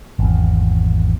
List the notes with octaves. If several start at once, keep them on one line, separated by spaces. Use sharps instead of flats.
G#1 E2